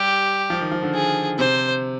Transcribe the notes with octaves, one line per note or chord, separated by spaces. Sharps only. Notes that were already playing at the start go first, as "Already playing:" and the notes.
Already playing: G3 G4
F3
D#3
F3
D3
G#4
C3 C5